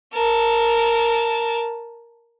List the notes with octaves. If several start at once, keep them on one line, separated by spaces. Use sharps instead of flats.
A#4 A5